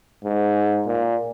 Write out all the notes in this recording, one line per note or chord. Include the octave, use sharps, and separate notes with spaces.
G#2
A#2